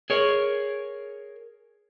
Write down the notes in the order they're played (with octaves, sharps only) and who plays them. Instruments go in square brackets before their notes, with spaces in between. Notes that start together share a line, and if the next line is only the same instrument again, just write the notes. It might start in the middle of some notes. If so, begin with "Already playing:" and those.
[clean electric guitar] G#4 A#4 C#5